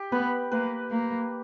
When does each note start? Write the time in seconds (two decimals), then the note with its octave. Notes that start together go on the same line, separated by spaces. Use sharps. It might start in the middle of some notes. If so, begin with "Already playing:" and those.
Already playing: G4
0.12 B3 B4
0.52 A#3 B4
0.91 A#3